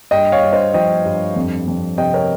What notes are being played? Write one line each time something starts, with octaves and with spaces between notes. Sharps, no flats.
G2 D#5 G5
C#5 F5
G2
C5 D#5
F3 D#5 G5
G2
F2
F2
C3 D#5 G5
A#4 C#5